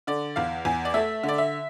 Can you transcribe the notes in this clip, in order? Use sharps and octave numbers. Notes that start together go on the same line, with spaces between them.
D3 D5
E2 F5
E2 G#5
D5
A3 E5
D3
D5
E5